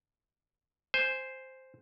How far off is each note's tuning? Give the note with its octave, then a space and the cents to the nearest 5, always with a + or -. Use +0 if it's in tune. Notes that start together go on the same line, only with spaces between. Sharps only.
C5 +0 G#5 +0